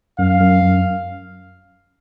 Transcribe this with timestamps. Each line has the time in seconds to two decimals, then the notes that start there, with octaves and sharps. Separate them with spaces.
0.19 F#2 F5
0.41 F#2
0.62 F#2